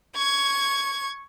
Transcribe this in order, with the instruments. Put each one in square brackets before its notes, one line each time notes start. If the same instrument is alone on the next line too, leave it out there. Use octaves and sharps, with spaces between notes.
[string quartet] C#6 G#6